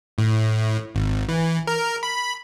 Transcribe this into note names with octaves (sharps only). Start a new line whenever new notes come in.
A2
G#1
E3
A#4
B5